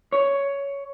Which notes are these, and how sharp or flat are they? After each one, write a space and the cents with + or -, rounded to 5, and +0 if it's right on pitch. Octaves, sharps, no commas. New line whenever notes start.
C#5 +10